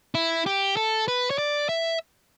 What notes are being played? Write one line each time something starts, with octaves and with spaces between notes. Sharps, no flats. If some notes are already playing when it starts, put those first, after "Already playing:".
E4
G4
A4
B4
C#5
D5
E5